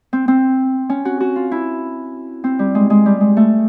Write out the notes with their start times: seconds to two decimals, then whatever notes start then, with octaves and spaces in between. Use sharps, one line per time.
0.13 C4
0.28 C4
0.89 C#4
1.05 F#4
1.20 F#4
1.36 F4
1.51 E4
2.44 C4
2.59 G3
2.75 G#3
2.90 G#3
3.06 G3
3.21 G#3
3.37 A3